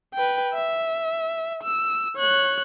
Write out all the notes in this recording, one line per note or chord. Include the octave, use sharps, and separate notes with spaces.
B4 G5
E5
E6
C#5 F#6